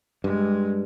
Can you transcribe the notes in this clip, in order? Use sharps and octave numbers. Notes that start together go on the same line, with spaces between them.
G2 G#3